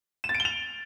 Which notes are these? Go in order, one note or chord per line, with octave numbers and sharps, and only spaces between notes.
E7
A6
D7
G7
F7